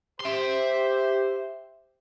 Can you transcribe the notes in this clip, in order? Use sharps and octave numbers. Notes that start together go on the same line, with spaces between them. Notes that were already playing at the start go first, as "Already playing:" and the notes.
G4 C5 E5 C6